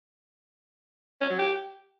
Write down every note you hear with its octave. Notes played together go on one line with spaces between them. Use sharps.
C#4
F#3
G4